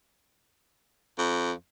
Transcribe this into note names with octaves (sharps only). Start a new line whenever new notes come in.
F2